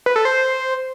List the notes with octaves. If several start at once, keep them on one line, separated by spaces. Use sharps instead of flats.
B4
A4
C5